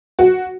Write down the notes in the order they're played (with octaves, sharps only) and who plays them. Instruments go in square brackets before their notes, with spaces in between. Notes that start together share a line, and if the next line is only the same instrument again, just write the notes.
[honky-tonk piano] F#4